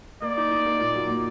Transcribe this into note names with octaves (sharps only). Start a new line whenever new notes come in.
A#3 D5
D#4
D#4
A#3
A#2
F#3
A#2